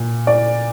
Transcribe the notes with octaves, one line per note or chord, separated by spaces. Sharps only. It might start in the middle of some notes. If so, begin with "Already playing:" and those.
Already playing: A#2
D5